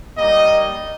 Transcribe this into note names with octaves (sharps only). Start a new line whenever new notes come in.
G3 A#3 D#4 D#5